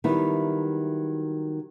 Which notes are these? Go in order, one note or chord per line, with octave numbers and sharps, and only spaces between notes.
D#3 F#3 G3 B3 E4